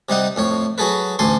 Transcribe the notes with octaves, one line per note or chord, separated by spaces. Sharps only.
C3 G3 D#4 F#5
F2 A2 C#5
F#3 F#4 G#4 A4 B4
A1 D2 A2 A4 G#5 C6